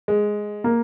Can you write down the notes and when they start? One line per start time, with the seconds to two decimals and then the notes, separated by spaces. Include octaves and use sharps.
0.08 G#3
0.64 A#3